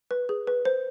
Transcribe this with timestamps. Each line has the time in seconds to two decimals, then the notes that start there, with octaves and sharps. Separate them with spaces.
0.11 B4
0.29 G#4
0.47 B4
0.65 C5